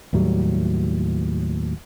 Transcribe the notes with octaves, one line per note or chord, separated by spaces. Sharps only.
D#2 A2 F#3 G3